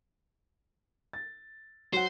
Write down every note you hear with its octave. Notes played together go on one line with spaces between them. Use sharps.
A6
F#3 C5 F#5